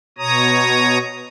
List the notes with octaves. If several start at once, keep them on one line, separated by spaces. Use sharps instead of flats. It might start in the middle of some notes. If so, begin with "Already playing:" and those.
B2 C#5 A#5 D#6